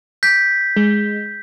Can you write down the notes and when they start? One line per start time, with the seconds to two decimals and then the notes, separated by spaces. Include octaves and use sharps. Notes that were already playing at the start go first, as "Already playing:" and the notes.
0.23 G6 B6
0.76 G#3